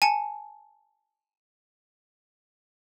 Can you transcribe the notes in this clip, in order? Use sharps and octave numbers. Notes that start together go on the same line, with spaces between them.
G#5 A5 C#7